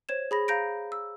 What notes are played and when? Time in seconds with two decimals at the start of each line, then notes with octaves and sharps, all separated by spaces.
0.09 C5 C#5 G#6 E7
0.31 G#4 B5 A#6
0.48 F5 A#5 G6 A#6 D7
0.92 E6